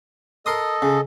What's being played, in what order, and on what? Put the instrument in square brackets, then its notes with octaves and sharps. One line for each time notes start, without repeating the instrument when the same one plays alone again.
[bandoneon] A4 D#5 [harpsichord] A#4 C6 D#6
[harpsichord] C#3